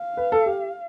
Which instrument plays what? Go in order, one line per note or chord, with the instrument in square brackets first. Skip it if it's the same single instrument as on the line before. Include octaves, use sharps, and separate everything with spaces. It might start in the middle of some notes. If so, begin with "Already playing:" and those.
Already playing: [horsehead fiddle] F5
[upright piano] B4
A4
G4